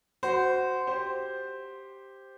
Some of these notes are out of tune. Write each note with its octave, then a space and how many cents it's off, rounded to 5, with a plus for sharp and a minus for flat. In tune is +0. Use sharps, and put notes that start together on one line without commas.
F#4 +5 C5 -15
G4 +0 C5 +0